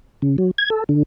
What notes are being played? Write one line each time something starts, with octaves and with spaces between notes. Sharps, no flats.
C#3
F#3
G#6
A4
D3